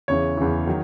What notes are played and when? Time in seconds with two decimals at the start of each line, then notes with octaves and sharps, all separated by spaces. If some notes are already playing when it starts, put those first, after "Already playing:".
0.08 E2 C#3 E3 C#5
0.37 E2 C#3 E3
0.67 D#3 F#3